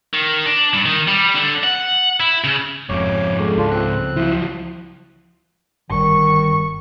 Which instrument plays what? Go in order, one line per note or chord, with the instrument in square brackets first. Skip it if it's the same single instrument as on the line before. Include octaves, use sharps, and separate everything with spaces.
[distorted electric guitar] D#3
D4
G2
D#3
G3
D3
F#5
E4
C#3
[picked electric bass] F1 F2 [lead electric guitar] G#2 F3 [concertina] C#5 D6
[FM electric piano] G#3 A4
[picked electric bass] C#2 [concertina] D4 F4
[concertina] C4 F#6
[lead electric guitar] F3 F#3 [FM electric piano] E4
[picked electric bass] G1 G2 [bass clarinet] D#3 [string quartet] C#6